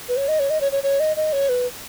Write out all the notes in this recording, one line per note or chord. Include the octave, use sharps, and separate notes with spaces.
B4
C#5
D#5
C#5
D#5
C#5
C#5
C#5
D#5
D#5
C#5
B4